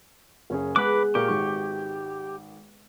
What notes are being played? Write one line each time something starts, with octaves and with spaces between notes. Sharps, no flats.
F#1 C#4 G#4
G#3 B3 B4 D6 F#6
A#2 G4 A#4 C#6 D#6 D7
G#1 D#3 C#6